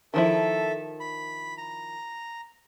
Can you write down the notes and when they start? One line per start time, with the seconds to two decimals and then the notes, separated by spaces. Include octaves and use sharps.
0.14 D#3 F3 E4 A4 E5
1.00 B5
1.58 A#5